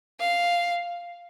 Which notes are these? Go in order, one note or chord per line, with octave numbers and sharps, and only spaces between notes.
F5